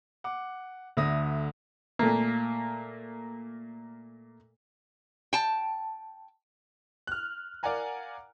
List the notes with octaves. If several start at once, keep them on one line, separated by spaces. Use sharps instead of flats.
F#5 D6
D2 D3 E5 D#6 A#6
A#2 A3 A#3
G5 A5
F6 F#6
A#4 D5 F5 F#5 G#5 A#5